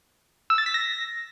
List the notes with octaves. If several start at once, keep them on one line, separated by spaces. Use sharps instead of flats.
E6
A6
B6
A#6